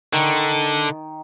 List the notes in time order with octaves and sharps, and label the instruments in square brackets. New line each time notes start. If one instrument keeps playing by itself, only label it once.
[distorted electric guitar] D3 [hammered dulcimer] D#3